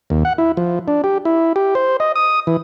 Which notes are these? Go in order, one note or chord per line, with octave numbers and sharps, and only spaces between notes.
D#2
F#5
E4
F3
D4
G4
E4
G4
C5
D#5
D#6
E3